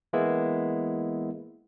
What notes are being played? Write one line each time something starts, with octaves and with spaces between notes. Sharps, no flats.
E3 G#3 A#3 B3 E4